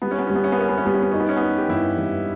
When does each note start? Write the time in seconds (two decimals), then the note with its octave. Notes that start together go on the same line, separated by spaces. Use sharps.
0.02 G3 B3
0.11 C#4
0.18 B3
0.27 G3 C#4
0.35 B3
0.44 C#4
0.52 B3
0.58 C#4 A#4
0.69 B3
0.77 C#4
0.85 G3 B3
0.94 C#4
1.03 B3
1.11 C#4 D#4
1.20 B3
1.29 C#4
1.37 B3 D#4
1.58 G4
1.69 G2 E4
1.97 G2